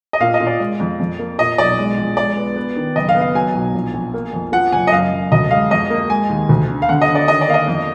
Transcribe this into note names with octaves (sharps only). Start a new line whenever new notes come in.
D#5
A#2 F5
D#5
A#2
D5
G#3
F2
F2
A#3
A#2 D#5
B1 D5
G#3
A#1
G#3 D5
B3
B3
D#3
F#1 D#5
F5
B3
F5
F#3 G#5
B1
A#1
A#1
A#3
F2
F3 F#5
F#1 G#5
D#5
F#2 F5
F#2
D2 D#5
G#3 F5
F2 D#5
A#3
G#3 G#5
D#2
D2
D3
F5
D3 F#5
D#5
D3
D5
D#3 D#5
D5
A#3 F5
D#5
F2